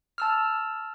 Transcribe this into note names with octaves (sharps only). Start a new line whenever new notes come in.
A5 E6 F6